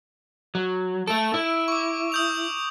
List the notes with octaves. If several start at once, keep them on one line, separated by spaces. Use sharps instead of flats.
F#3
A3 A4 D7
E4
C#6 D6
D#6 G6 F7